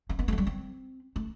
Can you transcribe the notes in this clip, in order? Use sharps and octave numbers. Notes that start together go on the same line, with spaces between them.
C4
B3
A3
F3
G3
C4
A3